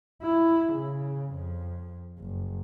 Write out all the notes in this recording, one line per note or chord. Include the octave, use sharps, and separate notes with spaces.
E4
C#3
F2
F#1